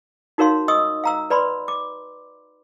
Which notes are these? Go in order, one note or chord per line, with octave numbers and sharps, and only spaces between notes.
D#4 F#4 A#4 C#5 F5 C6
D#5 C#6 D#6 E6
F5 A#5 E6
B4 D5 B5 C6
D6